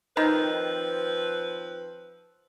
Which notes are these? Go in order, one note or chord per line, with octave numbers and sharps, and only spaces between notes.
D#3 F3 C4 B4